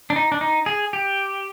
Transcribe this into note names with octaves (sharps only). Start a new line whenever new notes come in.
D4
D#4
D4
D#4
G#4
G4